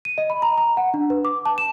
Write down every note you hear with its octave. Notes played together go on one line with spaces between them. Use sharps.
D#7
D#5
B5
A#5
A#5
F#5
D4
B4
D6
A5
E7